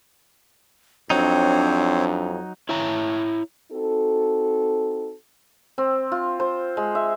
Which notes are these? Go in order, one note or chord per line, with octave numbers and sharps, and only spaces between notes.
F2 F#3 C4 D4 D#4 C5 C#5
E4 C#5 A#5
C4 D#4 F#4 A4
C4
F4
C5
G#3
E5